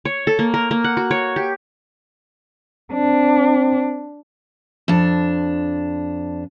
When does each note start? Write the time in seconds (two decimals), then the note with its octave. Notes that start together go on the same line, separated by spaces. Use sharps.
0.05 C#5
0.27 A4
0.39 A#3
0.54 A#4
0.71 A#3
0.84 F#5
0.97 F#4
1.11 C#5
1.36 G4
2.93 C4 D4
4.88 F2 D4